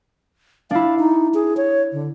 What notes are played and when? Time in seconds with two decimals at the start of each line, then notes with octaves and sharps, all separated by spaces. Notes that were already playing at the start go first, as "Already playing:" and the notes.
0.71 D4 E4 F5
0.99 D#4
1.34 G#4
1.57 C#5
1.92 D3